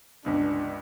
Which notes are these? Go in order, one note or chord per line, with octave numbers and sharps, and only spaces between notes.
G1 C#2 G2 D4